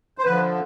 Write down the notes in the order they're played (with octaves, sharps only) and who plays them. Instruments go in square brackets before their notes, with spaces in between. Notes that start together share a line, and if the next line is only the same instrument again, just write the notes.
[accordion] C5
D3 F3 B4